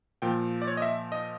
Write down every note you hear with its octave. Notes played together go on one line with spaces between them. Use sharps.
A#2 F3 G5
D5
C#5
D#5
E5
D#5